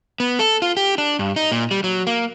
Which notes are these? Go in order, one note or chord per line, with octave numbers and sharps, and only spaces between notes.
B3
A4
F4
G4
D4
G2
D#4
A#2
G3
F#3
A#3